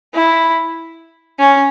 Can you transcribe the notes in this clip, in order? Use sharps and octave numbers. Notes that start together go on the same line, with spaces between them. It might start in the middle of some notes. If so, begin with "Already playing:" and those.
E4
C#4